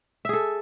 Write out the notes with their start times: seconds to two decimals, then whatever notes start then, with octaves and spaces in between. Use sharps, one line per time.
0.25 E5
0.29 G#4
0.33 A4